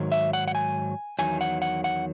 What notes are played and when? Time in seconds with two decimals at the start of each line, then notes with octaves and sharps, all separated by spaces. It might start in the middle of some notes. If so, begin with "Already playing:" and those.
Already playing: G#2 D#3 F#3
0.12 E5
0.33 F#5
0.48 F#5
0.55 G#5
1.19 E2 D#3 F#3 G#5
1.41 F#5
1.62 F#5
1.84 F#5